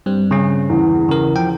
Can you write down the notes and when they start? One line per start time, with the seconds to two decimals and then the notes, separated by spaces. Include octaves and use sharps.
0.06 G2 G3 C4
0.31 C#3 C#4
0.70 E2
1.09 C#3 A#4
1.36 F3 G5